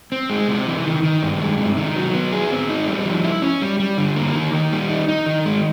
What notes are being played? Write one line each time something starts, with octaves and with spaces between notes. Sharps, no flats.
C4
G#3
C3
E3
D#3
D#3
G2
G#3
C3
D#3
F#3
B3
G#4
C4
D#4
G3
F3
E4
C#4
G3
G3
D3
A#3
D#3
D#3
G3
D#4
D#4
D#3
G#3